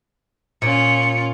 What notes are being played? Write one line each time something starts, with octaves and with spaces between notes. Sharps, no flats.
A#2 C#4 F4 C#7